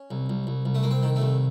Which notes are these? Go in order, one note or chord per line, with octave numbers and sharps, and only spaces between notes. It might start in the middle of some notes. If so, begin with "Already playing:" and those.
Already playing: C#4
C2
C2
C2
C2
A3
C2 A#3
C4
D#3
A3
C2